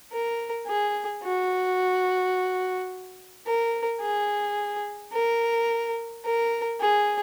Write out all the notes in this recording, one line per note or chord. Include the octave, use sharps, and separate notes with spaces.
A#4
G#4
F#4
A#4
G#4
A#4
A#4
G#4